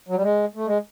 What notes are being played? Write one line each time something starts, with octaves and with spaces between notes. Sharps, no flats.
F#3
G3
G#3
A3
G#3